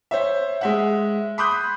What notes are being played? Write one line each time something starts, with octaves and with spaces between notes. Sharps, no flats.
C5 C#5 E5
G#3 E5 F#5
B5 C6 D6 D#6 F#6 G6